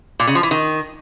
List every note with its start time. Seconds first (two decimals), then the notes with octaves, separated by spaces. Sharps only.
0.20 A#2
0.27 C#3
0.35 F3
0.43 E3
0.51 D#3